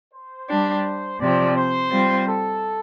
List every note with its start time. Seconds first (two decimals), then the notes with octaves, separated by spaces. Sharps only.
0.13 C5
0.49 G3 D4 G4
1.20 C3 F3 C4 D5
1.55 C5
1.91 G3 C4 F4
2.27 A4